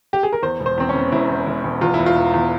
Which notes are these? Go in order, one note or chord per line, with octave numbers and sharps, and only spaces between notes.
G4
G#4
A#4
E2 C5
E1
C5
E2 C4
C#4
E1
E1 E4
E2
E1
E1
E2 F4
E4
E1
F4
E1
E2